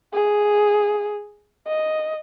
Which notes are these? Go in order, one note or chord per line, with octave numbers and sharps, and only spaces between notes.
G#4
D#5